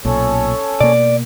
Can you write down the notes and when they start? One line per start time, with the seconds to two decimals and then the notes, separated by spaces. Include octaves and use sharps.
0.05 B1 A#2 C#4 A4 C#5
0.80 B2 A#3 D5